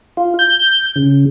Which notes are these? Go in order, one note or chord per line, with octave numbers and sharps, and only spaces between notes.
F4
G6
C#3